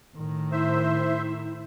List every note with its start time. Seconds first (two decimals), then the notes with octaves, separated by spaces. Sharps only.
0.15 A2 D#3
0.52 E4 C5 E5